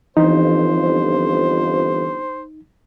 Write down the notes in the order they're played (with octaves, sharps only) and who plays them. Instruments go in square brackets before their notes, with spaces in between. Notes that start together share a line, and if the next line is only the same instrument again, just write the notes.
[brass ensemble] G1 F2 [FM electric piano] E3 [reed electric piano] D#4 [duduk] C5